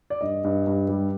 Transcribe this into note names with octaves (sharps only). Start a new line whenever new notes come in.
D5
G2 D#5
G2
G2
G3